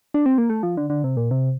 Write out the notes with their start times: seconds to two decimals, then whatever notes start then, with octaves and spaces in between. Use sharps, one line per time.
0.14 D4
0.26 C4
0.38 A#3
0.50 A3
0.63 F3
0.77 D3
0.90 D3
1.04 C3
1.17 A#2
1.31 C3